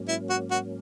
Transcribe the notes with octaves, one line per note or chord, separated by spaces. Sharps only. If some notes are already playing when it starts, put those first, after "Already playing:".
Already playing: G#2 F#3 A#3 C#4
E4
F#4
F#4